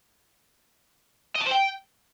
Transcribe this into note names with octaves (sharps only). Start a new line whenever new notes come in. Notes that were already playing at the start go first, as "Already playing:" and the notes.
D#5
A5
C5
G5